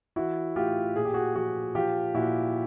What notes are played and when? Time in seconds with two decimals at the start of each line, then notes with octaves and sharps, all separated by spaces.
0.16 E3 E4 F#4
0.56 A2 F4 G4
0.95 A#2 G#4
1.05 G4
1.14 F#4 G#4
1.36 F3 F#4 G#4
1.75 F3 F4 G4
2.14 A#2 E4 F#4